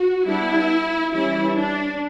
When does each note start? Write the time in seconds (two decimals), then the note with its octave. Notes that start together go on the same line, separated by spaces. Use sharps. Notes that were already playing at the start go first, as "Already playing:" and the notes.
Already playing: F#4
0.26 G3 B3 D4 E4
1.13 E3 G3 C#4 E4
1.58 D4